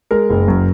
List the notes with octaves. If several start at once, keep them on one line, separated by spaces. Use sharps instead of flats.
G#3 A#4
F#1
F#2